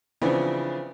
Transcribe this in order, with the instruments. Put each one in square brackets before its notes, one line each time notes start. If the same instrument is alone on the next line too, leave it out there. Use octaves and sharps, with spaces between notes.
[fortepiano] C#3 E3 F3 B3 C4 D4